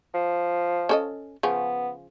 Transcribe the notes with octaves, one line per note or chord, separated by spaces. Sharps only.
F3
C#4 A4 D#5
C#3 F3 B3 C#4